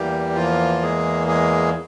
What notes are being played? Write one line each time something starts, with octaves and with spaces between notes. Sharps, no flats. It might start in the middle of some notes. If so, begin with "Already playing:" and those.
Already playing: E2 E3 G3 A#3 G4
F3 F4
G#3 G#4
G#3 G#4